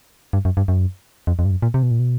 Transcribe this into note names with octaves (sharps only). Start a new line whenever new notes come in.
G2
F#2
G2
F#2
F2
F2
G2
F#2
A#2
C3
B2
A#2
B2